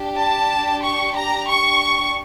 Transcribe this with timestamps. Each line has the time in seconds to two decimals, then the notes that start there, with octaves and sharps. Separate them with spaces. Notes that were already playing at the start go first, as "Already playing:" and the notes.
Already playing: D4 G4
0.17 A5
0.82 C#6
1.15 A#5
1.48 C#6